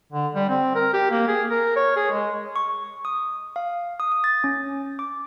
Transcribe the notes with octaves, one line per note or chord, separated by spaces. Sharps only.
D3
G3
C4
A#4
G4
A#3
G#4
A#4
C#5
G#4
G#3
C#6
D#6
F5
D#6
D#6
A6
C#4
D6